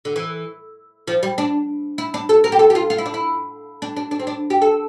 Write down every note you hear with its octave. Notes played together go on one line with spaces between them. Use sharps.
D3
E3
F3
G3
D4
E4
D4
A4
A#4
G4
A4
G4
F4
F4
E4
D4
E4
D4
D4
D4
C4
D4
G4
A4